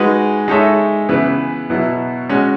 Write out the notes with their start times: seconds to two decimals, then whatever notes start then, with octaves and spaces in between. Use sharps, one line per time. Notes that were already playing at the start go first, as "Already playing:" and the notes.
Already playing: G#3 D#4 F#4 B4
0.48 G#3 D#4 A4 C#5 E5
1.09 C#3 E3 B3 E4 B4
1.70 B2 F#3 B3 E4
2.29 G#3 C#4 F#4